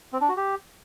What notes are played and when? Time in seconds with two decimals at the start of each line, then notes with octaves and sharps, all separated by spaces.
0.13 C4
0.21 D4
0.29 F#4
0.37 G4